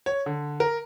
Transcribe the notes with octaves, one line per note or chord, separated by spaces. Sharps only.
C#5
D3
A#4